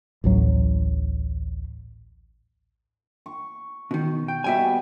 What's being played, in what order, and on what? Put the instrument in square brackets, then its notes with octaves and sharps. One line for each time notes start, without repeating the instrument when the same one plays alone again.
[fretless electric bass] A1 D2 A2 F#3
[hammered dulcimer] C#6
[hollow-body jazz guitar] B2 D#3
G5
[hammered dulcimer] B2 G3 [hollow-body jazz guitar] E5 G5 G#5